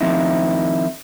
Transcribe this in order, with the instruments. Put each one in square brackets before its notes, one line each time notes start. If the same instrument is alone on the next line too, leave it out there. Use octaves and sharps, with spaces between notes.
[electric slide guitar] D#3 F3 C4 D#4 E4